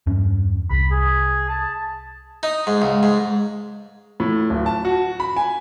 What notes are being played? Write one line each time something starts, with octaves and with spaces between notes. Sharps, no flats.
E2 G2 C#4
C2 B5
G#4
A5
D#4
G#2
C#2
G#2
A2
D1
A5
F#4
B5
G#5